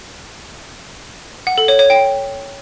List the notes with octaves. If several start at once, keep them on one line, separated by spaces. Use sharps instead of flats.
F#5
A4
C#5
C#5
G5